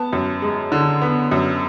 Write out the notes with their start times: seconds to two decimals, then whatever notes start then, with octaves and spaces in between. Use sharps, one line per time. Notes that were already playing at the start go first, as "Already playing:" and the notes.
Already playing: B3 A5
0.13 F#2
0.42 G#3
0.72 D3
1.02 B3
1.31 F#2